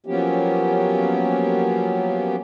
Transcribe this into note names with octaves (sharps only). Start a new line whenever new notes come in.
F3 F#3 A#3 B3 C#4 G4